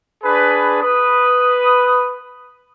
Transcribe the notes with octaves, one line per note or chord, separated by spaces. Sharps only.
D4 G#4 B4
B4 D#6